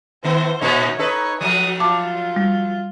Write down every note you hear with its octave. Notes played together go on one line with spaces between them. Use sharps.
A2 D#3 B3 C5
A#2 A3 D#4 C#5
D#4 A4 B4 C#5
F3 F#3 A3 D#6
F4 A5 D6
G3